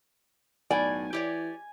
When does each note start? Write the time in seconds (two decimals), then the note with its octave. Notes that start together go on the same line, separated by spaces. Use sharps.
0.71 B1 A2 D5 G#5
1.13 E3 G4 C#5 D5